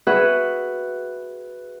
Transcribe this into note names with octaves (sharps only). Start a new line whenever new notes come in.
F#4 G#4 B4 E5 F#5